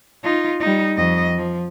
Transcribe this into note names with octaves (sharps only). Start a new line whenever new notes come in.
D#4 F4
G3 D#4
F2 D#5
F3